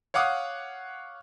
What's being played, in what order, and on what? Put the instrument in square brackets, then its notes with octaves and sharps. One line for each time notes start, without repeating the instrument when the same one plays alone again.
[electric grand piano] C#5 F5 F#5 D6 D#6